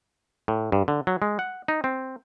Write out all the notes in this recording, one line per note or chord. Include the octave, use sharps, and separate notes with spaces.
A2
G2
D3
F#3
G#3
F#5
D#4
C4